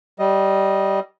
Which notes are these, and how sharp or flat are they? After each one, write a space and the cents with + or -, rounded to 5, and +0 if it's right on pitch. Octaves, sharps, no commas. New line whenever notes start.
G3 -15 D#5 +0